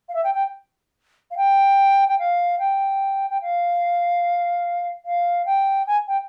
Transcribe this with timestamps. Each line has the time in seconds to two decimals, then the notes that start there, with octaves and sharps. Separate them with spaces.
0.09 F5
0.14 E5
0.24 G5
0.34 G5
1.31 F5
1.37 G5
2.08 G5
2.19 F5
2.59 G5
3.30 G5
3.42 F5
5.06 F5
5.46 G5
5.87 G#5
6.08 G5